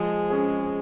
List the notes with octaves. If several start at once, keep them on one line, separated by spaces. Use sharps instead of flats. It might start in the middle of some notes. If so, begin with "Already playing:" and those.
Already playing: F3 G#3
C#4 G#4